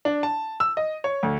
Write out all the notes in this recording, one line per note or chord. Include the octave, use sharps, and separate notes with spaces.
D4
A5
E6
D#5
C#5
D2